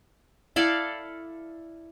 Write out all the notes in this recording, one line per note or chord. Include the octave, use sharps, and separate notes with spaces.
E4 A4 D5 F5